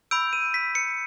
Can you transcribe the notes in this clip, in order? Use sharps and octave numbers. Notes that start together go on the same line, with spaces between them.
B5 E6 G6 D7
D#7
B6
C#7